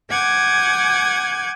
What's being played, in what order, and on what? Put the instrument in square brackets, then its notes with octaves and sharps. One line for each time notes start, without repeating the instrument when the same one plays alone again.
[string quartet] F#5 G#5 D6 G6 G#6